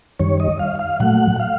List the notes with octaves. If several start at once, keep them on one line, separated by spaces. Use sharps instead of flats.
F#2 D#3 G3 C#5
D#5
F5
F5
A#2 F#3 A3 F#5
F5